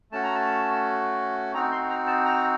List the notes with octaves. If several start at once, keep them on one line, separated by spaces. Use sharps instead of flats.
A3 C#4 F#4 A5
A#5
A5
C4 D#4 F#4 A#5
C6
A#5
A5
A#5